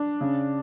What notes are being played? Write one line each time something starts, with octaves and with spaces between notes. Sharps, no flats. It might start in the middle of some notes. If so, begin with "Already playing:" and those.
Already playing: D4
C#3